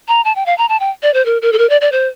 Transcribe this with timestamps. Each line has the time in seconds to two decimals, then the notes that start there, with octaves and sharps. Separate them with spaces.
0.08 A#5
0.25 A5
0.36 G5
0.46 F5
0.58 A#5
0.69 A5
0.80 G5
1.03 D5
1.14 C5
1.26 A#4
1.42 A#4
1.53 A4
1.58 A#4
1.70 D5
1.81 D5
1.92 C5